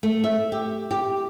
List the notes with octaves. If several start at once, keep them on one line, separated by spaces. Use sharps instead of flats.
A3
E5
G4
G4